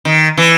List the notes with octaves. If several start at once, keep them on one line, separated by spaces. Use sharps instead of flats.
D#3
E3